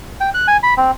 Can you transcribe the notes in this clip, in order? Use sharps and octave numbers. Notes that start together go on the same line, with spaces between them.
G5
F#6
G#5
B5
C4